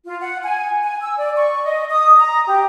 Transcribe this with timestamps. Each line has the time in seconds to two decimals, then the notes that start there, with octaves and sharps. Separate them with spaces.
0.05 F4
0.21 F#5
0.43 G#5
0.83 G#5
1.02 E6
1.17 D5
1.36 C#6
1.64 D#5
1.91 D#6
2.17 A#5
2.47 G4